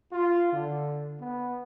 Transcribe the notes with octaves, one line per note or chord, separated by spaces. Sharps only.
F4
D3
B3